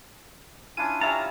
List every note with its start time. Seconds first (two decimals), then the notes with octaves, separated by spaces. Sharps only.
0.77 C#4 D4 E4 F4 D#7
1.01 G3 C#4 E5 A#5 A6